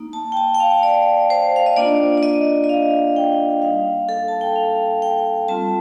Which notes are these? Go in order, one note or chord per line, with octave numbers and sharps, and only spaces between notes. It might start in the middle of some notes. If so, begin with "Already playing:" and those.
Already playing: A#3 D#4
A5
G5
A5
G5
F5
D5
C5
F5
D#5
A#3 D4 F4 D5
D5
D#5
D#5
F5
G5
G3 A#3 D#4 F5
A4
A5
G5
F5
G5
G3 C4 F4 A5